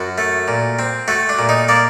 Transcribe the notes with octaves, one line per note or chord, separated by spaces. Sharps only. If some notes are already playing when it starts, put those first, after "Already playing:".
Already playing: F#2 F#4
A3
A#2
C4
A3 F#4
D4
A#2
D#4
A#3 D5